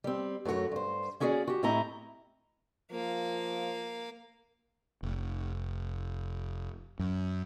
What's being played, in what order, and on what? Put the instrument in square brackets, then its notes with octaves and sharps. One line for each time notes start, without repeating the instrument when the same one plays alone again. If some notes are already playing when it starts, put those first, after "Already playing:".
[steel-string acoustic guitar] G3 C4
F#2 A3 C#4 F#4 C#5
G2 C5
A#3 C#4 F#4 G#4 B4 D5
F#4 G4
A2 A3 C4 E4 D#5 A#5
[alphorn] F3 [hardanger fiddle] A#3 F5
[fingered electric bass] F1
F#2